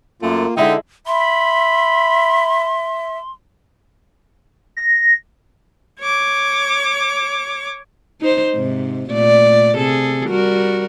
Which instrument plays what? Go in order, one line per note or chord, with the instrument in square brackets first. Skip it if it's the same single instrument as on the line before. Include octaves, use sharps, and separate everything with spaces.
[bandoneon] F#2 [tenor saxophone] A3 [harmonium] A#3 F4
[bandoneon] D3 [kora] G#3 E4 A4 [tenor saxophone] D#4 [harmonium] E5 G5
[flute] E5 [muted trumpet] B5 [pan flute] C6
[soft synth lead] A#6
[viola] C#5 D6
[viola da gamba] D#4 C5
G#2 C3
A#2 A3 D5
C3 G#4 A4
G3 F#4 A#4